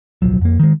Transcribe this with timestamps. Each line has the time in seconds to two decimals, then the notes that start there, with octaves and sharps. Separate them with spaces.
0.22 D1 B1 F3 F#3
0.41 F2 A#3
0.60 D#3 G#3